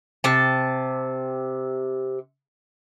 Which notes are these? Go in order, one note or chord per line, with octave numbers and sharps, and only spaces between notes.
C3 A5